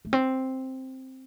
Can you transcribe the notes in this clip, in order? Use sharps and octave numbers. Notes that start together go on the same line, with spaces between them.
A3
C4